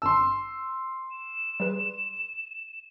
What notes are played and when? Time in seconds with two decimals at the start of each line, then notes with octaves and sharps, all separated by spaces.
0.02 G#1 G2 A5 C6 E6
1.11 E7
1.60 G3 G#4 B4